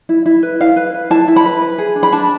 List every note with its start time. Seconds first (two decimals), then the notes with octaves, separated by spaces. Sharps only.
0.09 E4
0.26 E4
0.43 B4
0.60 E4 F5
0.76 B4
0.94 B4
1.10 E4 A5
1.28 E4
1.36 B5
1.45 B4
1.62 B4
1.78 G#4
1.96 D4
2.03 B5
2.12 D4 A5